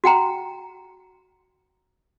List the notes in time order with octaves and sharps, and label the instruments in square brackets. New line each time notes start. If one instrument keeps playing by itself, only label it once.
[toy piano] F#4 F#5 G5 A#5